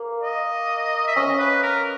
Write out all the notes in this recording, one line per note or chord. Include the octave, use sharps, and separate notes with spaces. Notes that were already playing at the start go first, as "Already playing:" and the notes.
Already playing: A#3
D#5
E5
C#4 D#5
B4
A#4